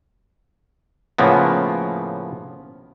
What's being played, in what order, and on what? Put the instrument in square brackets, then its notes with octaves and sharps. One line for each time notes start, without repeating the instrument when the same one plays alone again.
[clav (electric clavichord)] A2 C#3 F3 A#3 B3